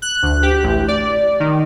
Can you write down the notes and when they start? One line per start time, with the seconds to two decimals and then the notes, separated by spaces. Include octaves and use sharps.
0.02 F#6
0.23 D2
0.43 G4
0.63 A1
0.88 D5
1.40 D#3